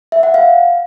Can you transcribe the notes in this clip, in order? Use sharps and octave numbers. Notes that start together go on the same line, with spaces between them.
E5
F#5
F5